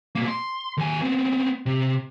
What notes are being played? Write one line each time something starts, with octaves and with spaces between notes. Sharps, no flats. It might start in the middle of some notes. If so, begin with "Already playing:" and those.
B2 A#3
C6
D#2 G#5
B3 C4
C3